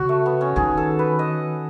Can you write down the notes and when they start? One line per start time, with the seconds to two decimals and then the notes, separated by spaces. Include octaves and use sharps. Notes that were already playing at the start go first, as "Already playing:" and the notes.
Already playing: C#3 F#4
0.09 A3
0.26 B3
0.41 C#4
0.56 D#3 G#4
0.77 A4
0.99 B4
1.19 D#5